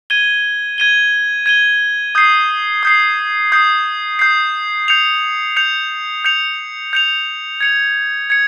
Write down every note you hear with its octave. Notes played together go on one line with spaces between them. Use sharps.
G#6 D#7 G7
G#6 D#7 G7
G#6 D#7 G7
D#6 G6 C7
D#6 G6 C7
D#6 G6 C7
D#6 G6 C7
G6 C#7 F7
G6 C#7 F7
G6 C#7 F7
G6 C#7 F7
G#6 C#7 F7
G#6 C#7